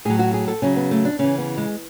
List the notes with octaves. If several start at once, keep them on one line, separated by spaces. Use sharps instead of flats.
A2 F#3 G#4
F#4
G#4
A4
C#3 F#3 C#4
B3
A3
D4
C#3 E3 C#4
B3
G#3